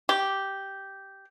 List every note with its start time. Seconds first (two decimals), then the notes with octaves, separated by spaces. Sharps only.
0.09 G4